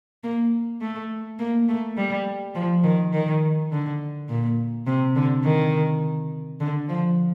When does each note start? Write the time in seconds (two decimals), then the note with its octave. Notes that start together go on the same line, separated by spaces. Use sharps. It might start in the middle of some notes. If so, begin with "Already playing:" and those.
0.24 A#3
0.81 A3
1.39 A#3
1.68 A3
1.97 G3
2.55 F3
2.84 D#3
3.13 D#3
3.71 D3
4.29 A#2
4.87 C3
5.15 D3
5.44 D#3
6.60 D3
6.89 F3